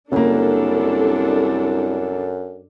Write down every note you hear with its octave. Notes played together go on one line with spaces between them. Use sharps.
C2 F#2 C#3 A#3 D4 A4